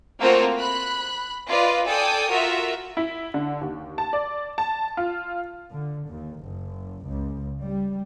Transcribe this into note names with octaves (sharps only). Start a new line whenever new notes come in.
A3 A#3 C4 F4 F#4
B5 F#6
F4 B4 D5 D#5
A4 D5 G5 G#5 D#6
F4 F#4 A#4 E5
E4
D3
D#2
A5
D5
A5
F4
D3
D#2
F#1
C#2
G3